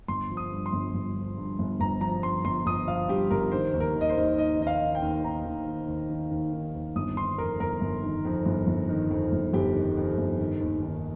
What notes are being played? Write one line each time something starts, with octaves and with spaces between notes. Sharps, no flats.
G1 C6
F3
D#6
G2
C6
G1
G1
F3
G2
G1
G1 A#5
F3 A#5
G2 C6
G1 C6
G1 D#6
F3 F5
G2 G4
G1 A#4
D#3 C5
D#2
A#4
D#3
D#5
C5
D#2
D#3 D#5
D#2 D#5
F5
D#3
G5
D#2
D#3 A#5
D#2
D#3
D#2
D#3
D#2
D#3
D#2
G1 D#6
D#3 C6
F2 A#4
G1 A#4
G1
D#3
F2
G1
G1
D#3
F2
G1
G1 G4
D#3
F2
G1
D#3
D#2
D#3